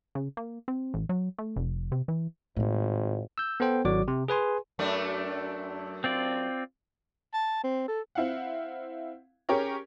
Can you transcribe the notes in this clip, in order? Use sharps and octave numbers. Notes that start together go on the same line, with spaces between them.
C#3
A#3
C4
A1
F#3
A3
F1
C3
E3
G#1 A2 F4
E6 G6
B3 A4 C5 G5
G#1 F#3 F#4 D5 D6
C3
G#4 B4 G#5 C6
F#2 A3 D4
C4 F4 D5
A5
C4
A4
C4 E4 F5 F#5
C#4 G4 G#4 A#4 C#5